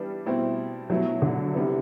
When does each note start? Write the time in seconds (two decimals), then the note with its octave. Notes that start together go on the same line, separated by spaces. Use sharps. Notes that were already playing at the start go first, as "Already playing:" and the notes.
Already playing: E3 G3 B3 D4
0.26 B2 A3 C4 E4
0.90 B2 F#3 A3 E4
1.22 D3
1.54 C3 G3 B3 E4